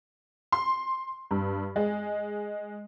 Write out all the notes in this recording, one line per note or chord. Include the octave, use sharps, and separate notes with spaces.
C6
G2
G#3